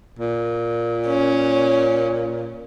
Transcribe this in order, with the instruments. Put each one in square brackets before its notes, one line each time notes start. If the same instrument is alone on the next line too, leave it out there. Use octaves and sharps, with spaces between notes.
[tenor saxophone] A#2
[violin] C#4